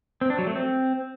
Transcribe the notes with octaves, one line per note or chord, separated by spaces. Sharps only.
C4
D4
F#3
A3
C4